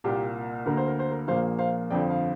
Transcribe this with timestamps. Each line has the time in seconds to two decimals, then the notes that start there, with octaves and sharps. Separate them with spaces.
0.04 C2 A#2 A#3 G4
0.66 D2 D3 A#3 A#4
0.77 C5
0.88 A#4
0.99 C5
1.11 A#4
1.28 A#1 A#2 F3 A#3 C5 F5
1.59 C5 F5
1.90 G1 F2 D3 F3 D5 G5
2.10 F5